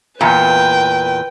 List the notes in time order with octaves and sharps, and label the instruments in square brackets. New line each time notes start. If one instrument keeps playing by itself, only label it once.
[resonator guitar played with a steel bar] E2 A#2 [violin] B4 G5